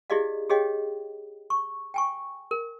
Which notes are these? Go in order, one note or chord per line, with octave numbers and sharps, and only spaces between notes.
E4 G4 G#4 D5 D#5 F5
G4 G#4 C#5 D#5 F5 G5
C#6
G5 G#5 C#6
A#4